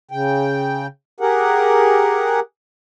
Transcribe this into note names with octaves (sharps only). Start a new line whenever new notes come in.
C#3 G5
G4 G#4 A#4 F#5